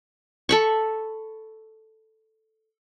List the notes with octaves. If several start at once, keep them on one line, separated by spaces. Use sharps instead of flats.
A4 B5 C#6